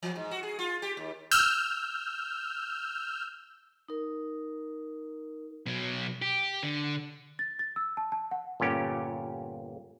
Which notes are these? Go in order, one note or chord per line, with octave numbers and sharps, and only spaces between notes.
E3
G#2
F#4
G#4
F4
G4
D#2
E6 F6 G6
D#4 A#4
B2 F#3
G4
D3
A6
A6
E6
A5
A5
F#5
G1 A#2 C#4 G4